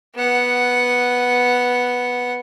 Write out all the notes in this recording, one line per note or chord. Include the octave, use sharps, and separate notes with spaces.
B3 F#5